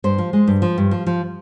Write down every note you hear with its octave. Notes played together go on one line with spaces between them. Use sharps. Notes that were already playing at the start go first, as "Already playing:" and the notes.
G2 C5
F3
G#3
G2
F3
G2
F3
F3